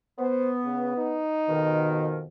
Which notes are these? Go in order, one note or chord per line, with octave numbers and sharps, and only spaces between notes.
B3 C5
C#3
D#4
F2 B2 D#3